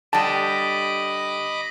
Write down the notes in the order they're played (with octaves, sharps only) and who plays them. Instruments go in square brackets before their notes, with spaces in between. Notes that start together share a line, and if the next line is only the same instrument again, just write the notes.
[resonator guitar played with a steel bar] D3 G3 [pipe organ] D#5 B5 D6 [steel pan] A5